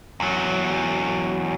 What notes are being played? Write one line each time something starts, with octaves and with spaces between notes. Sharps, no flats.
E2 F#3